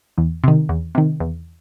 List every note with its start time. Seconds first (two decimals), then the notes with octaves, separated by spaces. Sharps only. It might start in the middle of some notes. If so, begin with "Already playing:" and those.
0.18 E2
0.44 C3 D#3
0.69 E2
0.95 C3 D#3
1.20 E2